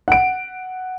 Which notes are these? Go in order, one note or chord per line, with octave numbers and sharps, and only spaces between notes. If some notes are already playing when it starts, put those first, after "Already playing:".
F#5 D7